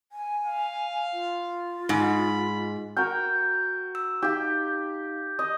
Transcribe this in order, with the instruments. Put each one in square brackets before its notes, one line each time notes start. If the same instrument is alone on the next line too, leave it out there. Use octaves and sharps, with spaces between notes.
[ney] G#5
[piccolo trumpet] F5
[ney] F4
[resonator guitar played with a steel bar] G#2 [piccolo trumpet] B5
[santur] F#4 A#4 G5
[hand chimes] E6
[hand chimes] D#4 F5 [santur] G4
[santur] D#5